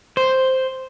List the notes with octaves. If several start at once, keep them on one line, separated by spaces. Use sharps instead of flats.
C5